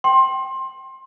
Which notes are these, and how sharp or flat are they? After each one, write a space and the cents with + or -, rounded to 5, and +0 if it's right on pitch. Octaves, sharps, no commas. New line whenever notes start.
G5 -15 C6 +20